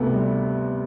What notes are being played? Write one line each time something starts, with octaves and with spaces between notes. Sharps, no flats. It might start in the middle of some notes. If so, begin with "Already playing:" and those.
Already playing: D2 C3 B3
G3